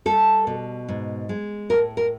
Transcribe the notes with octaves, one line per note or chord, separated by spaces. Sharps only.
G3 A4
B2
G#2
G#3
A2 A#4
A#4